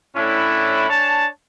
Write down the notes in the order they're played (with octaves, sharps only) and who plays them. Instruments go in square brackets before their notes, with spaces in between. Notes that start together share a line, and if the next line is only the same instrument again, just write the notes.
[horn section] A2 C#4 D4 E4
D4 C#5 G#5 A5